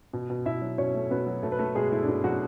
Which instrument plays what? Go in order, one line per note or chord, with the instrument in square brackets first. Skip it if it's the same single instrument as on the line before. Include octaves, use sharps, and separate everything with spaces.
[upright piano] B2
B2
B2 E4 E5
F#3
B2 C#4 C#5
A3
B2 B3 B4
F#3
B2 A3 A4
B4
A3 A4
B2 G#3 G#4
A3 E4
D4
B2 E4
B2 F#3 F#4